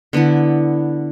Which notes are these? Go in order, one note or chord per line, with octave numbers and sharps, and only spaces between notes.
D3 B3 D4 E4